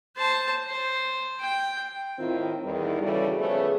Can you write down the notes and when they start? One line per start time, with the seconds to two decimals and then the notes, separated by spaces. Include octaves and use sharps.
0.16 C5 A5
0.68 C5
1.40 G5
2.19 A2 D#3 C4 E4 F4
2.64 E2 D#3 G3
3.02 C#3 E3 G3 F#4 A4
3.39 C#3 F3 A3 B3 G#4 C#5